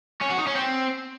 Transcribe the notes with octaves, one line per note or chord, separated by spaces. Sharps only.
C#4
F#4
D#4
C#4
C4